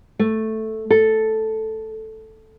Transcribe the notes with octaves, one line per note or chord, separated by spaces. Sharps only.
A3
A4